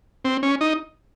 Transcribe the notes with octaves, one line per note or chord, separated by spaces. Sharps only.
C4
C#4
D#4